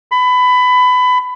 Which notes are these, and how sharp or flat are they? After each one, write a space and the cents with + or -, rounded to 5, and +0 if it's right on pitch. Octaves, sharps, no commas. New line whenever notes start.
B5 +20